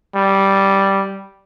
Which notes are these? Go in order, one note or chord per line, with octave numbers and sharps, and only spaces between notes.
G3